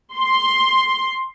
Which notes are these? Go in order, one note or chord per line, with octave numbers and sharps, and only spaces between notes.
C6